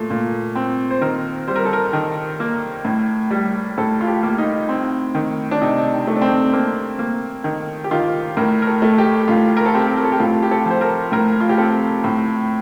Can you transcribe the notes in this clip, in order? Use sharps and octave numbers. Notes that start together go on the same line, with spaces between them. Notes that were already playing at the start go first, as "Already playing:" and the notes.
Already playing: A#2 A3
A#2
C4
C5
D#3 A#4
G3 C5
A#4
A4
A#4
D#3
A#3
A2
G3
A2 A4
F4
G4
A#3
D#4
C4
D#3
D4
C3 D#4
A3
D4
C4
A#3 C4
A#3
D#3
G4
D#3 F4
A2 A#4
A#4
A4
A3
G4
A2 F4
A#4
A4
C4 G4
A#4
A4
G4
A2 F4
G4
A4
F3 C5
A#4
A2 A#4
F4
G4
C4 A4
A2